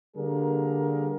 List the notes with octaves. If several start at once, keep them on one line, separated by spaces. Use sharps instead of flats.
D3 G3 A#3 G#4 A#4